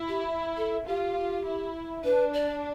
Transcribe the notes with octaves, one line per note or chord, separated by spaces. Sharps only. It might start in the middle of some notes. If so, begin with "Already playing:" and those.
Already playing: E4
G4
A4
F4 G4
E4
D4 B4
D5